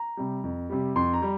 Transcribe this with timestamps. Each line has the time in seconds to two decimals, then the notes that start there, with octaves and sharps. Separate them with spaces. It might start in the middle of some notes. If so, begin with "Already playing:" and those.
Already playing: A#5
0.17 C3 G3
0.44 F2
0.70 C3 G3
0.95 F2 C6
1.13 A#5
1.22 G3